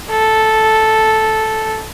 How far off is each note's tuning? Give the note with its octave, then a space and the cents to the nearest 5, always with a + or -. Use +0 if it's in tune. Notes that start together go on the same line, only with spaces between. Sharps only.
A4 -5